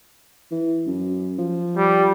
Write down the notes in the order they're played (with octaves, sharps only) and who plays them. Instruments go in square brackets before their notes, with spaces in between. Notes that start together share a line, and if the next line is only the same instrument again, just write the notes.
[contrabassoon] E3
F#2
F3
[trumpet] G3